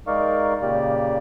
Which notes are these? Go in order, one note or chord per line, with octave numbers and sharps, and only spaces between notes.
G#3 D#4 A#4 D5 F5 C#6
A#2 C#3 A#3 G4 D5